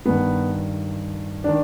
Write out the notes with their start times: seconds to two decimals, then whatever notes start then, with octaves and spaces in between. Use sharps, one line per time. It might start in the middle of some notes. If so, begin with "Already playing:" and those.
0.06 G2 D#3 B3
1.44 D#3 D4